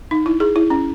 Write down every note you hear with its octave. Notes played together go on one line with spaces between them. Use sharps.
D#4
E4
G#4
E4
C#4